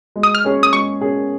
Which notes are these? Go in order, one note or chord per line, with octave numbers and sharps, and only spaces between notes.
G#3
D#6
F6
C#4 G#4 C#5
D#6
G#3 C#6
C#4 G#4 C#5